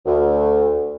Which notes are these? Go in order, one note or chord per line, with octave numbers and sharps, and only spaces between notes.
D2